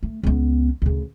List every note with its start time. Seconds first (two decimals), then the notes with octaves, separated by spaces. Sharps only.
0.03 A3
0.23 C#2 B3
0.82 D2 C#3